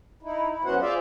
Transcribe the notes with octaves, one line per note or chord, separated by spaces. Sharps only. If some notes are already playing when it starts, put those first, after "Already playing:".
D#4 E4
E4
F#2 B3 C#4 F#4 C5 F#5
F4 G#4 C5 D5 E5 F5